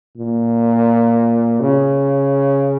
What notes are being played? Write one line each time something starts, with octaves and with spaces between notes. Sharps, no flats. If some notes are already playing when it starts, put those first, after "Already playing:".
A#2
C#3